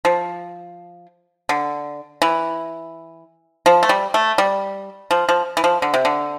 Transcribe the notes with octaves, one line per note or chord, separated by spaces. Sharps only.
F3
D3
E3
F3
A3
G3
A3
G3
F3
F3
E3
F3
D3
C3
D3